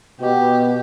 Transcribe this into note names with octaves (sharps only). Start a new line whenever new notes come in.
B2 G4